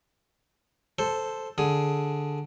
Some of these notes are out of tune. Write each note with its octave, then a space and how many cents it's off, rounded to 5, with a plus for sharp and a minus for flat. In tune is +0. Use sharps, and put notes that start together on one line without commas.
A4 +0 C5 +0
D3 +0 G#4 +0 D#6 +40